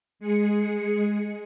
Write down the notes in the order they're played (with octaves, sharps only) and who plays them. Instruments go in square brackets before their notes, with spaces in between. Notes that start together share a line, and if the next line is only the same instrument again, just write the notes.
[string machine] G#3 G#4 C#7